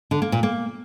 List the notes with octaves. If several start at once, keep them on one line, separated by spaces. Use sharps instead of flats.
D3
A#3
A#2
A#3